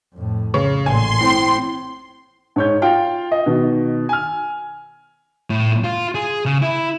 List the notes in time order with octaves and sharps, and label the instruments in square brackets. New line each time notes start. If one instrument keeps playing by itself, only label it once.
[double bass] F2 A2
[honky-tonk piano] C#3
[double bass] A1 A#2 [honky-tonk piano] G#5 [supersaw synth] C6
[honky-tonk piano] A2 [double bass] C4
[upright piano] G#2 C#5 G6
F4 F5 G5
D#5
B2 D#3
G#5 F6
[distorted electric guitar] A2
F4
G#4
C#3
E4